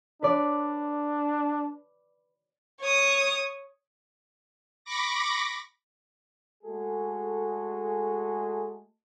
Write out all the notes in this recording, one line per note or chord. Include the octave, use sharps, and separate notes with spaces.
D4 B4 D5
C#5 D#6
B5 C#6 D6 A#6
G#3 A3 F#4 G#4 A4